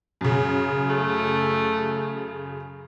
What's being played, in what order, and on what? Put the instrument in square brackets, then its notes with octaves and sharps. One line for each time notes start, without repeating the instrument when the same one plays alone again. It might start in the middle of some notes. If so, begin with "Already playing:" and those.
[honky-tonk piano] F#2 C#3
[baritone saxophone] A3